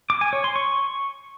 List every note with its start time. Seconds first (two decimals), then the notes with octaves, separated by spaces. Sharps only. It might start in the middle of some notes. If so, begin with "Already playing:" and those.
0.10 D6
0.21 G#5
0.33 C#5
0.44 C6
0.56 C#6